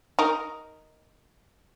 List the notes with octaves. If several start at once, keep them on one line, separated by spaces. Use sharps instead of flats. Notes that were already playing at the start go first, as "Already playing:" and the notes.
D#4 A#4